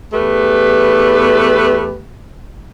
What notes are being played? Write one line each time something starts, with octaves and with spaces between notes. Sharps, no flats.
E2 A3 G4 B4